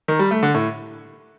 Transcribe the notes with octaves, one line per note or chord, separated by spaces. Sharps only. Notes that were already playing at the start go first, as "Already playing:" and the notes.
D#3
G3
A3
D3
A2